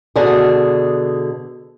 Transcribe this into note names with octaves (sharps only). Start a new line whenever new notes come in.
B2 D3 G#4